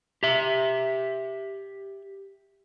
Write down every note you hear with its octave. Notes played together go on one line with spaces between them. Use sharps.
G4 E5